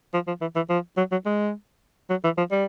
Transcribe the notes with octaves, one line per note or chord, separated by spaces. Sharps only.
F3
F3
E3
E3
F3
F#3
F#3
G#3
F#3
E3
F3
G3